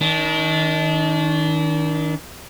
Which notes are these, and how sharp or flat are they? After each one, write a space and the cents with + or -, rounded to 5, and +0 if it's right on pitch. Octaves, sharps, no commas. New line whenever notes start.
D#3 +25 D4 -25